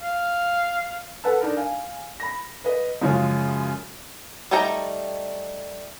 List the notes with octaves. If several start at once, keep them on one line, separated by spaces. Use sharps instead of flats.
F5
A4 B4 F#5 A5
D4 D#4 A#4
F5 G#5
B5 A#6
B4 D#5
F#2 C#3 F3 G#3 C#4 F4
G3 A3 D#4 G5 A#5